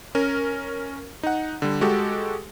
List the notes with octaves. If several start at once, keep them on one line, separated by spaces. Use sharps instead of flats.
C#4 A#4
D#4 F#5
D3 G3
G#3 F#4 G4 A4